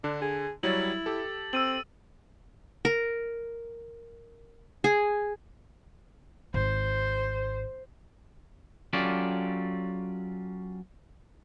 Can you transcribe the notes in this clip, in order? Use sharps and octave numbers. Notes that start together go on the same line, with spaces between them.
D3 D4
G#4
F#3 G3 E4 C#5 A6 F#7
G4 A4
C4 E6 D#7 F#7
A#4
G#4
G#1 C5
F#3 C#4 F4 G4 A4 D5